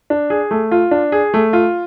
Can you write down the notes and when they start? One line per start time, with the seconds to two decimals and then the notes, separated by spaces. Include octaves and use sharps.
0.10 D4
0.30 G#4
0.51 A3
0.71 F4
0.91 D4
1.12 G#4
1.34 A3
1.53 F4